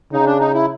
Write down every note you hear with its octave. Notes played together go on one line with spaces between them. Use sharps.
C#3 D#4
D4
D#4
E4